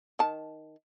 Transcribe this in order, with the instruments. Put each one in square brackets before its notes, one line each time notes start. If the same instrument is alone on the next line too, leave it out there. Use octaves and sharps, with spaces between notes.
[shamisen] D#3 A5